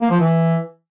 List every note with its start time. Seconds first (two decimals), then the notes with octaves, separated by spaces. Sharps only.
0.02 A#3
0.11 F3
0.20 E3